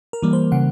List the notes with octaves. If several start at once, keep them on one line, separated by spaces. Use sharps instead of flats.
A#4
E3 G3 A#3
C5
C#3 F#5